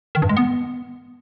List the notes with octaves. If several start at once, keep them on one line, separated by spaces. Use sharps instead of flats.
D#3
G2
G#3
B3